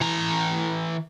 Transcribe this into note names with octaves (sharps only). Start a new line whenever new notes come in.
E3 A#5